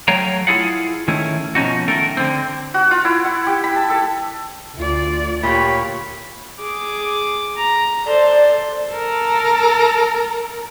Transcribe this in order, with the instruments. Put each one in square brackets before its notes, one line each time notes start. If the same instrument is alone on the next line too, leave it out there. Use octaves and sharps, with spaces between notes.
[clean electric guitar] F#3 A3 C#5 F5 G5 A#5
E4 F4 G#4 A4 F5 F#5
D#3 A3 C#4 E4
B2 F3 C#4 D#4 F#4
D#3 A3 A4 A#4
D3 C4
[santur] F#4
F4
E4
F#5
G4
B5
A5
A4
[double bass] D2 [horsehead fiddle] F4 D5
[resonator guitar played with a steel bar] A#2 [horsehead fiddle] G4 C#5 [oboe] B5
[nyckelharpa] G#4 D6
A#5
[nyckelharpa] A4 C5 [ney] D5
[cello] A4 A#4